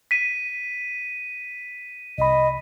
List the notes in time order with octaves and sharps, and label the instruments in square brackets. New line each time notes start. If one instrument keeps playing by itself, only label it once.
[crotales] B6 D#7
[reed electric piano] C2 B5 [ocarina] D#5